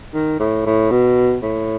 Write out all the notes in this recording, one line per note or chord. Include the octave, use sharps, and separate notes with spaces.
D#3
A2
A2
B2
A2